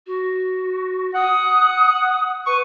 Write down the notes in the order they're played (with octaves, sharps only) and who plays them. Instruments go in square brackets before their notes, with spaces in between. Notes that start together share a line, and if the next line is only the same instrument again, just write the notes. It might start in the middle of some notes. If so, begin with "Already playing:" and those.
[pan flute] F#4
[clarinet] F#5 [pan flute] D#6
[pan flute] B4 [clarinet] C#6